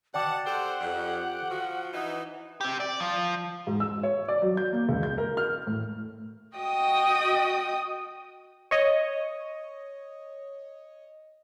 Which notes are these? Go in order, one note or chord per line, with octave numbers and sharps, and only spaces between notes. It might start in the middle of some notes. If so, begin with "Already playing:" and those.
B2 D5 F#5 G5 A5 D6
C4 G4 A4 C5 F#5
F2 G4
F3 F#4
E3 D#4
C4 G4
D5
F3
G#2
E6
C#5
D5
F#3
G6
A#3
C#2
G6
A#4
F6
A2
F#4 D#5 G5 D#6
C#5 D#5